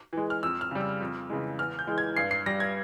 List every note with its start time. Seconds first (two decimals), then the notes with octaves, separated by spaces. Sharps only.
0.13 E3 G#3
0.30 F6
0.43 F2 E6
0.61 F6
0.71 C#3 G3
0.81 E6
1.01 F2
1.30 C#3 E3 G#3
1.59 E2 F6
1.79 G6
1.87 E3 G#3
1.98 G#6
2.17 G2 C7
2.31 C7
2.46 G3 A#6
2.60 G#6